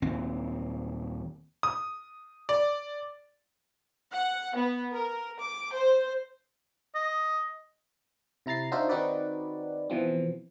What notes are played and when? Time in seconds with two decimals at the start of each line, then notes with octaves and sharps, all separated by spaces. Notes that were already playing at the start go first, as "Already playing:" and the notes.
0.02 D#1 D#2 C4
1.63 D#6
2.49 D5
4.10 F#5
4.54 B3
4.95 A#4
5.41 D6
5.74 C5
6.95 D#5
8.46 C3 E4 A#5 A6 C7
8.72 D4 D#4 F4 F#4 C5 E5
8.89 D#3 C4 D#4 F#4 B4 D5
9.90 B2 E3 F3 C4